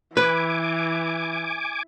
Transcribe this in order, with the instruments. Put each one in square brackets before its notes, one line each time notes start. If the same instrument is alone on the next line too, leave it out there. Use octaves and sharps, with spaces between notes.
[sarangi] E3 [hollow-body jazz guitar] B4 [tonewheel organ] G#5 D6